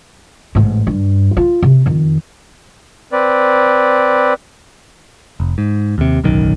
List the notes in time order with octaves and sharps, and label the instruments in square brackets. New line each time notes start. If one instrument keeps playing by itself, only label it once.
[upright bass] A1 G#2
G2
F4
C3
F2 D#3
[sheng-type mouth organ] C4 B4 D5
[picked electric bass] F1
G#2
D#2 C3
D1 B1 F#2 D#3